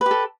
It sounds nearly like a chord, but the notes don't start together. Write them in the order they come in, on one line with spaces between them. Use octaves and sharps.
B4 G4 A4